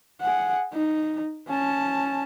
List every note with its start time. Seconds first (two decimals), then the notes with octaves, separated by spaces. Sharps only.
0.21 G#4 F#5
0.73 D#4
1.48 C#4 A5